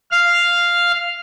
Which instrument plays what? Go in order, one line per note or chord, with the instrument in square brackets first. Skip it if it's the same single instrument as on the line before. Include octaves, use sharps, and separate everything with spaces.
[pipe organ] F5 F6